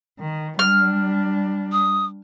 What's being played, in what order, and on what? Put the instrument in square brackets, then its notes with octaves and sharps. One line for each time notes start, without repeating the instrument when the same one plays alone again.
[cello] D#3
[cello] G3 D4 [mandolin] F6
[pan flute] D#6